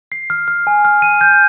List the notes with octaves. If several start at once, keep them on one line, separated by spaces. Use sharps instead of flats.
C7
F6
F6
G#5
F6
D#7
G6